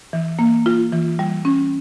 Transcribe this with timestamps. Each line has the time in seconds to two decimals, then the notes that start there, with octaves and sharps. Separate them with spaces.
0.13 E3
0.39 A#3
0.66 F4
0.92 E3
1.19 G3
1.45 C#4